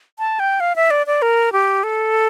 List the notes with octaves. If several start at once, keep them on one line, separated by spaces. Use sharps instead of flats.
A5
G5
F5
E5
D5
D5
A#4
G4
A4